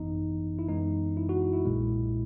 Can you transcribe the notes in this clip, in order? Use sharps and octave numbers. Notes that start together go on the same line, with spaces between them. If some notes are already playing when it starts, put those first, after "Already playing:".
Already playing: G#1 F#2 E3 B3 D#4
E4
F#2 E3 G#3 B3 D#4
E4
F#4
E4
B1 A#2 G#3